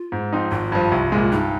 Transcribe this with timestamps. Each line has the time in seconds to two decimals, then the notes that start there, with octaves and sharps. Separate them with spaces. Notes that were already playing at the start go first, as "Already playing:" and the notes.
Already playing: F4
0.12 G#2
0.33 F3 C4 D#4
0.51 G#1 F4
0.72 G2 F3
0.92 C2
1.12 A#2 G#3
1.31 G2 D#4